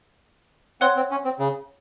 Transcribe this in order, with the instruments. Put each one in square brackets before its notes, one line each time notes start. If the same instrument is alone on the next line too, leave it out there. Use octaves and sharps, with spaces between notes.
[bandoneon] C4 [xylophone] C#5 F#5 C6 F#6
[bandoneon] C4
C#4
C4
C#3